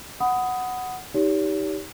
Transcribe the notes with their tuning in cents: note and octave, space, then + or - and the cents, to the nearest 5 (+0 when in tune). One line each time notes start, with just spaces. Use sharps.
F#5 +0 B5 +20 D#6 +10
D#4 +25 G4 +0 C#5 +35